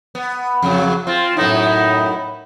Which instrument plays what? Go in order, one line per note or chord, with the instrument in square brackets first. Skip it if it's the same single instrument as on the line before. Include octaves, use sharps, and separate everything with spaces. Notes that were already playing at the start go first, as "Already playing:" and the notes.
[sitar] B3
F2 C#3 F#3
[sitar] C4 [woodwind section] F4
[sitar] F#2 B3 E4 [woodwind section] A2 D#4